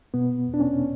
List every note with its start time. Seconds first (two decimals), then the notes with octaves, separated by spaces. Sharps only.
0.14 B2 B3
0.48 E2
0.54 D4
0.60 C#4
0.73 C#4